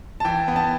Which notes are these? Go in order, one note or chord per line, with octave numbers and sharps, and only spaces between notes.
A5
E3 G5
B3
A5